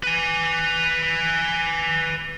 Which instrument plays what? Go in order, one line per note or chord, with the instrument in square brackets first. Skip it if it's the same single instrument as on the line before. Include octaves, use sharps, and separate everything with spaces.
[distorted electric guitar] B4 G#5